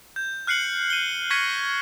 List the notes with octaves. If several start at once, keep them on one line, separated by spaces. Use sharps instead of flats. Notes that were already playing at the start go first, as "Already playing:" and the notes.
G6
F6 F#6 C7 C#7 F#7
D#7 G7
C#6 G#6 A#6 B6 C#7 D#7